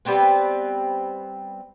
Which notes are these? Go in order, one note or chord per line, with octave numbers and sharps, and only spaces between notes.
G3 B3 C4 B4